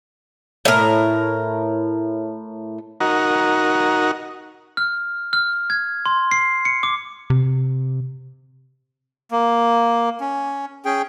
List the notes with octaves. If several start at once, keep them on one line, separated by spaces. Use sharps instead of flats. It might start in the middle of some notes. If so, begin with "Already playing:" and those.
A2 A#4
D#4 F#4 A#4
F6
F6
G#6
C6
C7
C#7
D6
C3
A#3
C#4
C#4 G#4 G5